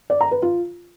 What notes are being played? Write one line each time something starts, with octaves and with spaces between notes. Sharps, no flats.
D5
A#5
B4
F4